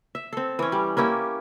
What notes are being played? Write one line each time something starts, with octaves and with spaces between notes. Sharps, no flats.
E5
C4 A4
E3 C#4
G3
A#3 C#4 E4 G4